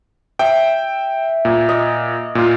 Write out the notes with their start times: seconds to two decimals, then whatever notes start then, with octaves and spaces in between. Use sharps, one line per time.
0.39 E5 G5
1.45 A#2
1.69 D#5
2.35 A#2 F4